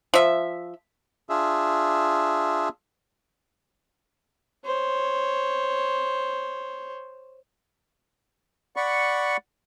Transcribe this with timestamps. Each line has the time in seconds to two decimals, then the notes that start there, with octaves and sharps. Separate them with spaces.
0.14 F3 E5
1.29 D4 F4 G#4 E5
4.65 C5 C#5
8.76 D5 F#5 B5 C#6